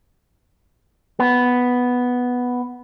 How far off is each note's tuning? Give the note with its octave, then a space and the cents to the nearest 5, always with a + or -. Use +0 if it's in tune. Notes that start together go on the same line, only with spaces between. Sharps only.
B3 +0